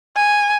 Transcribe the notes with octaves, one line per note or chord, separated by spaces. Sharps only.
G#5